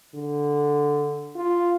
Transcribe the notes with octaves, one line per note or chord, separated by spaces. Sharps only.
D3
F4